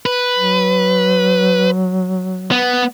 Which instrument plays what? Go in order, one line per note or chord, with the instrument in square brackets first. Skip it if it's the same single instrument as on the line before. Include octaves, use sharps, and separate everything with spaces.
[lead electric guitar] B4
[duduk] F#3
[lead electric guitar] B3